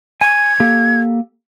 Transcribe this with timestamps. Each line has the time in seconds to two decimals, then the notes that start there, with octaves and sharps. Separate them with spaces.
0.21 G#5 G#6
0.60 A#3 G4 A4